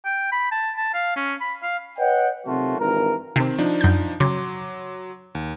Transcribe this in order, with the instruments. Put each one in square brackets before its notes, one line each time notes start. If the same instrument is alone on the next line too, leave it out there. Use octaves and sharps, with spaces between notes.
[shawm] G5
B5
A5
A5
F5
C#4
B5
F5
[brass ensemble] B4 C#5 D#5 F#5 G5
C3 D#3 F#3 A3 F4 F#4
G#1 G2 E3 A#4
[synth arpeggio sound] C3 [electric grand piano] D#3 C4
[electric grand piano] F3 D4 D#4
[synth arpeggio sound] F#2 G6
[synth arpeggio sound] C#3 [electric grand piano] F#3 C6 D6
[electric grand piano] D#2